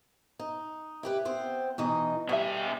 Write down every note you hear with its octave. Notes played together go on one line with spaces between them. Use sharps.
D#4
E4 G4 B4
B3 C4 C5
B2 E3 D#4
B2 G3 E5